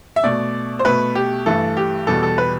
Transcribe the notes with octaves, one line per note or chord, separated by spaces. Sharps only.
E5
B2 A3 D5
C5
B2 A3 B4
G4
G2 E3 A3 A4
G4
E2 B2 G3 A4
A4
B4